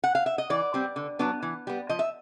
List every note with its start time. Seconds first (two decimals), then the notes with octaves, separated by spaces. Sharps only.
0.04 F#5
0.15 F5
0.26 E5
0.38 D#5
0.50 E3 D5
0.74 G3 C4
0.96 D3
1.19 F#3 B3 D4
1.43 E3
1.67 G3 B3
1.89 F3 D#5
1.99 E5